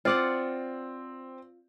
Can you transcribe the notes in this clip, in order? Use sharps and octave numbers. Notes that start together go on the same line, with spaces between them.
C4 F4 D5 F#5